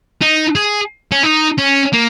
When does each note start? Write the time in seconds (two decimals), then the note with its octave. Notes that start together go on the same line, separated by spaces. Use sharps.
0.22 D#4
0.55 G#4
1.12 C#4
1.23 D#4
1.58 C#4
1.93 A#3